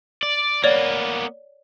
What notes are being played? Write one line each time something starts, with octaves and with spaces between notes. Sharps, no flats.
D5
A#3 B3 C#5 D5